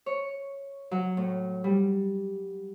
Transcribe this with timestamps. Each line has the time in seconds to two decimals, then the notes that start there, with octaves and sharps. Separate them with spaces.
0.06 C#5
0.91 F#3
1.17 A2
1.64 G3